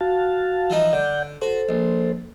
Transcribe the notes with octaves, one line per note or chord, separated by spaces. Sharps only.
F#4 F5 A5
E3 F3 D#4
D3 D5 F#5 G6
F#4 A4 C5
A#1